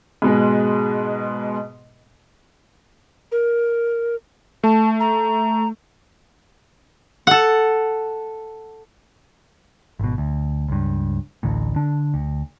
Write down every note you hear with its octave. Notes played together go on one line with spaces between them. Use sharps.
G#2 B2 G#3
A#4
A3 A5
A#5
A4 F#5
G#1 B2
D2
C#2 G2
A1 D2 A2
D3 D4
D2